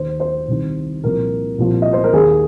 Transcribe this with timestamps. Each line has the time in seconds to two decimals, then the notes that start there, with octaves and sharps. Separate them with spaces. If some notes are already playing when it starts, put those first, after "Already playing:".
Already playing: D#2 D#3 C5
0.20 C5
0.47 C2 C3 D#3
1.04 C2 A#2 F3 A#4
1.58 C2 A#2 F3
1.82 D#5
1.93 C5
2.04 A#4
2.13 D#2 D#3 G#4